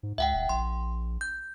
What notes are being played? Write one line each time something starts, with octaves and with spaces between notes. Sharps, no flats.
G#2
C#2 E5 F#5 G5
D#1
A#1 C6
G6